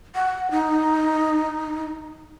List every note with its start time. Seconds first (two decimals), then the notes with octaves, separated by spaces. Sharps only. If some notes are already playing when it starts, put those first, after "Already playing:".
0.15 F#5
0.51 D#4